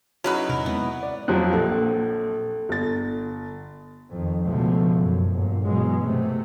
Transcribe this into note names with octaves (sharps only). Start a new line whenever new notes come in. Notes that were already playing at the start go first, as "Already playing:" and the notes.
F#3 C#4 D#4 E4 G#4 B4
E2 C3 A#4
C3 G#3 B3 C4
D5
F2 F3 F#3 G4 F#6
A#1 A4
G1 A6
F2 D#3
C#2 B2 D3 F3 A3
F#2
G1 A#2
B2 E3 F#3 G#3
C3 A3